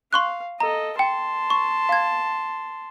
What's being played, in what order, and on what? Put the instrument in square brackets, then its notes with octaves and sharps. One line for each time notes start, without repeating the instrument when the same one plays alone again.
[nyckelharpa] F5 [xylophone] C6 C#6 F#6
[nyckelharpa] A4 D#5 [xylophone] A#5
[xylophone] G5 [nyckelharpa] A5 C6
[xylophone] C#6
F5 G#6